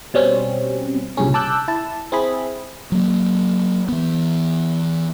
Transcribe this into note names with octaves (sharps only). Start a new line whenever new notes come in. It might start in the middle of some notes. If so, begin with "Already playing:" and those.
B2 G3 C4 C#4
C2 G2 A#2 C#3 C#4
A5 D6 E6 F#6 G6
E4 A5
C4 E4 G#4 B5
F#3 A#3
E3 B3